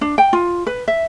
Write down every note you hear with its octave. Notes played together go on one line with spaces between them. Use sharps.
D4
G5
F4
B4
E5